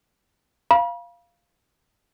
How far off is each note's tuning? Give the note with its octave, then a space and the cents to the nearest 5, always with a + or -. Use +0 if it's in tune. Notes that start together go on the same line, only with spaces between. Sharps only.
F5 -5 B5 -40